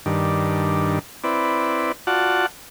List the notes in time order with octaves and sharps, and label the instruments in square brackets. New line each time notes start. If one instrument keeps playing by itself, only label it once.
[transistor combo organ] G2 D#3 D4
C4 E4 B4 D5
F4 F#4 D5 F#5 A5